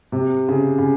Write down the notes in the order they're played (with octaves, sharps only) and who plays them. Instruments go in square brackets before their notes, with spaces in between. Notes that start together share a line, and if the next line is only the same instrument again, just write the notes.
[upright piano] C3
C#3
C#3